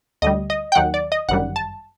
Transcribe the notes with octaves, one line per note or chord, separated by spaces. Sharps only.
D2 D3 G3 D#5
D#5
G5
D#2 D#3 F#3 F#5
D5
D#5
G1 F#2 D#3 G3 F#5
A5